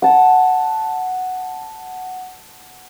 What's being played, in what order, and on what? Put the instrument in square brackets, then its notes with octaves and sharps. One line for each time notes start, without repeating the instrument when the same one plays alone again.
[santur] F#5 A5